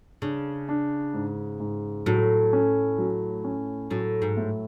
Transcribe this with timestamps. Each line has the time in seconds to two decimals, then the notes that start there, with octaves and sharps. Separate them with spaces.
0.22 C#3 D4
0.69 D4
1.14 G#2
1.60 G#2
2.06 A2 F#3
2.53 C#4
2.98 F#3
3.44 C#4
3.91 A2 F#3
4.22 G#2
4.37 A2